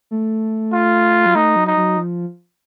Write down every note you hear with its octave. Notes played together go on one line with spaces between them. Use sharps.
A3
F4
F#3
A3 D#4
F#3
D#4
F#3
F3